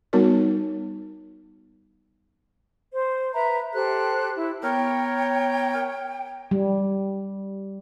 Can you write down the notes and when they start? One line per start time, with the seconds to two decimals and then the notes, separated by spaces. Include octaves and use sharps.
0.13 G3 B3 D#4 F#4 A#4 C#5
2.93 C5
3.33 B4 E5 A#5 B5
3.73 G4 A4 C5 F#6
4.36 E4
4.63 B3 A#4 C#5 G5
6.51 G3